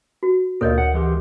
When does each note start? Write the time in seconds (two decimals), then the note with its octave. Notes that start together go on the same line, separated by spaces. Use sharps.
0.23 F#4
0.61 D2 A#2 A4 A#4 C#5 D#5
0.78 F#5
0.94 E3 G#3 G4